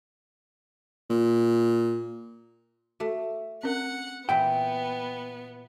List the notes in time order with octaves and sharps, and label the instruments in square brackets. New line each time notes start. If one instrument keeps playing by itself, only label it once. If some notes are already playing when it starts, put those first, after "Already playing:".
[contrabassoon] A#2
[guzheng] A3 [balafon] F#4 A4
[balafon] C4 C#4 A#4 [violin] F#5
[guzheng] A#2 E3 [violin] B3 [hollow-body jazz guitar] G5